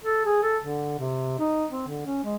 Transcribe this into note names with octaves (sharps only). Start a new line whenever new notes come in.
A4
G#4
A4
D3
C3
D#4
C4
D3
C#4
G#3